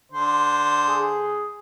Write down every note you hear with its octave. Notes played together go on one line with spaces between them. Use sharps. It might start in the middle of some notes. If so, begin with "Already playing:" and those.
D3 C5
G#4